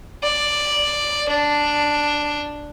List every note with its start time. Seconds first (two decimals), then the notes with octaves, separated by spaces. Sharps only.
0.23 D5
1.29 D4